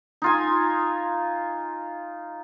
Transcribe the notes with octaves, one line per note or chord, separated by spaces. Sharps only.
D#4 F4 G#5